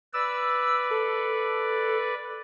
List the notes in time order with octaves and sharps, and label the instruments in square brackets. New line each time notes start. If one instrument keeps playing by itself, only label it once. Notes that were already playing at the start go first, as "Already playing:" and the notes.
[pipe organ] B4 D5 [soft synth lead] E6
[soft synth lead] A4